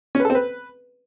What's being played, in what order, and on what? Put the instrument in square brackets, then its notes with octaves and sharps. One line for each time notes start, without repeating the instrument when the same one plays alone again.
[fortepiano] C#4
B4
A4
C4
B4